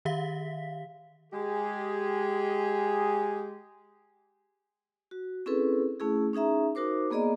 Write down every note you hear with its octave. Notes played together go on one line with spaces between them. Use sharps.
D#3 G4 E5 F5 B6
G#3 G4 G#4
F#4
C4 C#4 E4 G#4 A4 B4
A3 C#4 E4 G#4
C#4 D#4 G#4 E5 A#5
D#4 F#4 A#4 C5 D6
A#3 B3 G#4 D5 D#5 A#5